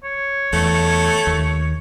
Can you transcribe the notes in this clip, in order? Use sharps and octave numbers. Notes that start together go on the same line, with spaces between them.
C#5
E2 A3
D#2